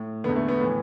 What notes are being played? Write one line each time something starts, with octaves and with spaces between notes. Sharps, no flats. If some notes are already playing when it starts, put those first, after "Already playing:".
Already playing: A2
E2 D3 B3
A3
B3
A2 E3